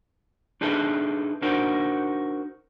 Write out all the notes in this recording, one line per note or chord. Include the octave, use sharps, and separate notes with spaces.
D4 D#4 G#4 A4 B4 E5
D4 D#4 F#4 A#4 C5